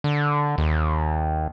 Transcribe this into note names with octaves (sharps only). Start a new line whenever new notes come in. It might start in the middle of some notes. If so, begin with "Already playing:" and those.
D3
D#2